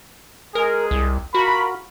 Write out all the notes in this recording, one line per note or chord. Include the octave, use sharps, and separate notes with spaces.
G#3 G#4 A#4
C2
F4 F#4 A#4 B5